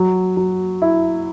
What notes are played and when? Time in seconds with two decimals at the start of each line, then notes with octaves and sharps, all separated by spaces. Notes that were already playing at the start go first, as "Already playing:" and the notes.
Already playing: F#3
0.37 F#3
0.82 E4